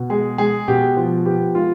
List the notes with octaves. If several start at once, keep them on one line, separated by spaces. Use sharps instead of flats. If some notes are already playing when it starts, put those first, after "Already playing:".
Already playing: B2
G#3 G#4
G#3 G#4
B2 G4
F3
B3 G4
G#3 F4